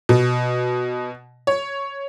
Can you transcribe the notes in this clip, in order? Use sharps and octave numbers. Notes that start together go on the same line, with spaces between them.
B2
C#5